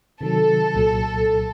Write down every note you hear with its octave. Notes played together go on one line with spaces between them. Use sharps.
C3 D#3 F#3 A4
C2 A#2 F#3